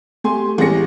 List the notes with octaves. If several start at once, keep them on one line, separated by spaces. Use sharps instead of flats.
A3 G4 G#5 C6
A1 G3 G#3 C#4 A#6 C#7